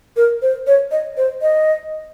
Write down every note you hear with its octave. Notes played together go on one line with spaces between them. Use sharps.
A#4
C5
C#5
D#5
C5
D#5